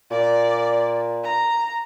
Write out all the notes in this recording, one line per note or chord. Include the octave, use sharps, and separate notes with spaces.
A#2 D5
A#5